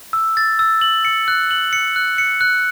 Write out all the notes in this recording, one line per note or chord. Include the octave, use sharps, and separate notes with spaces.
E6
A6
E6
F#7
C#7
F#6
F#7
C#7
F#6
C#7
F#6